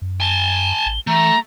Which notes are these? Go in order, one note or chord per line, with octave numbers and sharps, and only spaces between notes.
F#2
G#5 A5 G7
A1
E3 A3 A#5